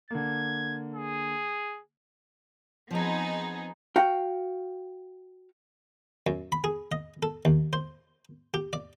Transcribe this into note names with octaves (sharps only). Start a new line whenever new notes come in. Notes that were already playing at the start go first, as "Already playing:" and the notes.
D3 A#3 G#6
G#4
F3 B3 C4 D#4 G#4
F#4 F5 G5
F#2
B5
G#4
D#5
A4
D#2
C5
G4
D5